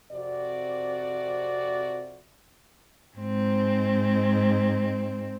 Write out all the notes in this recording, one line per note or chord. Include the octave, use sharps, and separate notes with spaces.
F2 C3 F#4 D5
G#2 C4